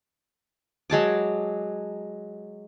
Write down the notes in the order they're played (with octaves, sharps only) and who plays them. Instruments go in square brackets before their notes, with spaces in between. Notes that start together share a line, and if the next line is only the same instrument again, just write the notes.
[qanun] F#3 G#3 A5 D6